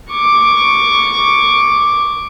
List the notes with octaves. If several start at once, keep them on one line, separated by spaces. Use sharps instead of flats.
C#6 D6